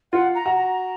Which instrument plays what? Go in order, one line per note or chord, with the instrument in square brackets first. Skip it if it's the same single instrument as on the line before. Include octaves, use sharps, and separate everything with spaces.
[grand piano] F4 [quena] F#5
[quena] A#5
[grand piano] F#4
[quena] A#5